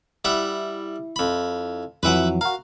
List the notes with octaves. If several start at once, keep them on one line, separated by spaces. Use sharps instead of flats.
G3 E4 E5 F#5
F2 B5
F2 E3 F#3 B4 E5 F#5
F#4 A#4 F5